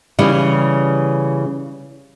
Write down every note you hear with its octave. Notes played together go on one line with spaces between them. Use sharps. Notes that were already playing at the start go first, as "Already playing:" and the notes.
C#3 E3 G3